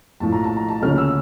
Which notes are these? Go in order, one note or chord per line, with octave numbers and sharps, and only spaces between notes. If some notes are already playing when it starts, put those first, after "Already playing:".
A#1 A2 F3 A5
A#5
A5
A#5
A5
D2 C#3 F3 A#3 C#4 F6
E6